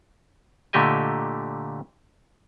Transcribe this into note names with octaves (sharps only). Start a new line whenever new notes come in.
A#2 D3 A3 G4 D#5 G#5